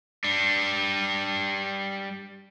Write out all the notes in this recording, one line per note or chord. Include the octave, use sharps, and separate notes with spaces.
G3 D4